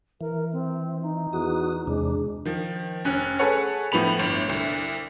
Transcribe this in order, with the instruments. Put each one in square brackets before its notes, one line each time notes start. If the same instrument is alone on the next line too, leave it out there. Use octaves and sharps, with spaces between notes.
[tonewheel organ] E3 [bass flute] A#4
[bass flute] C4
D#4
[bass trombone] E2 [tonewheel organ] F#4 D#6
[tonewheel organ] E2 C3 D4 [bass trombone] G#3
[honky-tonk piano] D#3 F3
F1 C#4 F#6
G#4 A4 B4 C#5 F#5
A2 F3 B3 B5 F7
G1 G2
C2 D3